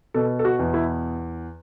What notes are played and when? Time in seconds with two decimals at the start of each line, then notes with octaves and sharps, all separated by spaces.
0.14 B2 A4
0.39 A4
0.45 F#4
0.59 E2
0.74 E4